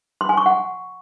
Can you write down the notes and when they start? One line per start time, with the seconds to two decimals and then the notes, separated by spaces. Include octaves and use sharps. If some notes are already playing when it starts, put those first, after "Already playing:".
0.21 C6
0.29 G#5
0.37 C#6
0.46 F#5